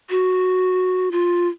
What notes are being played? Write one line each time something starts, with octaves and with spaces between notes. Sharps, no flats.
F#4
F4